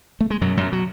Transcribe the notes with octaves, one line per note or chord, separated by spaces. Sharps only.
A3
G#3
F#2 B2 F#3
F#2 F#3
F#3